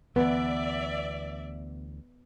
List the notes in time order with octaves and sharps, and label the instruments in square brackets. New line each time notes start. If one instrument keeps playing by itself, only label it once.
[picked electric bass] D2 E3 [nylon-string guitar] B3 [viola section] D5 E5